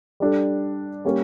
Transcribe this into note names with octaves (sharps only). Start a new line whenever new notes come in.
G3 D4 A4
G3 A#3 C#4 G4 A#4